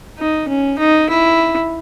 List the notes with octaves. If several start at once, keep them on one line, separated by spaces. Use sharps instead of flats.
D#4
C#4
D#4
E4